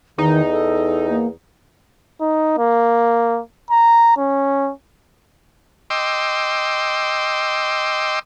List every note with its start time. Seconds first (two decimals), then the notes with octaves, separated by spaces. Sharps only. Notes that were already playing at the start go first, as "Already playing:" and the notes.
0.18 E2 D#3 D#4
0.51 A4
1.10 A#3
2.21 D#4
2.58 A#3
3.71 A#5
4.17 C#4
5.90 D#5 G5 C6 D6 E6